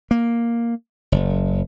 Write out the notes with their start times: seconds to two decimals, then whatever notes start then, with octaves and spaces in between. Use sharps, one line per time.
0.11 A#3
1.12 F#1